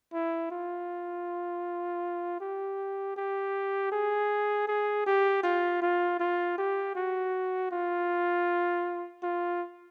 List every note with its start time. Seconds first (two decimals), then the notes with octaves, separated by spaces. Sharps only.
0.13 E4
0.51 F4
2.41 G4
3.17 G4
3.92 G#4
4.68 G#4
5.07 G4
5.43 F4
5.82 F4
6.20 F4
6.58 G4
6.96 F#4
7.72 F4
9.23 F4